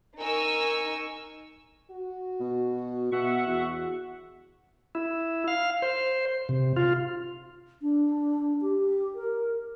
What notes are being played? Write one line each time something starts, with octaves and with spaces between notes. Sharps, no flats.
D#4 A#4 G#5 C#6 E6
F#4
B2
B2 E5 F#5 C#6
E2 F#4
E4
F5
C5
C3
F4
D4
G4
A#4